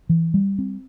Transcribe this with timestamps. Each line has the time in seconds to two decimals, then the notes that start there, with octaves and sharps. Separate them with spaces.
0.09 E3
0.34 G3
0.59 C4